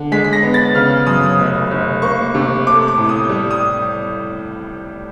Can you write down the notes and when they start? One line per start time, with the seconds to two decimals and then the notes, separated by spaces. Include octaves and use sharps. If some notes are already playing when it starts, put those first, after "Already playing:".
Already playing: D3
0.12 G#3 B6
0.24 B6
0.33 A#6
0.43 B3
0.54 A6
0.75 C#3 F6
0.91 F6
1.07 F#2 D#6
1.23 D#6
1.38 F1
1.71 F1
2.02 A#3 C#6
2.35 C3
2.67 A3 D6
2.88 D6
2.98 A2
3.09 D#6
3.30 G3
3.51 D#6